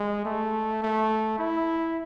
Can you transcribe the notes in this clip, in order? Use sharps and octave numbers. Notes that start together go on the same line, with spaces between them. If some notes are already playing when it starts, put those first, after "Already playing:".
Already playing: G#3
A3
A3
E4